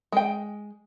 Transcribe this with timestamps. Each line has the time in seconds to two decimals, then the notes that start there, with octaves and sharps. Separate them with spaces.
0.12 G#3 G5